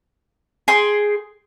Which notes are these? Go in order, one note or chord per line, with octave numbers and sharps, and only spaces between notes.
G#4 G5 C6